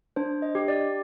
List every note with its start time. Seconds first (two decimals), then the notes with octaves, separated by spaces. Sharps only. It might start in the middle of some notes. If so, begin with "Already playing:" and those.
0.16 D4 C5
0.42 D#5
0.55 G4
0.68 D5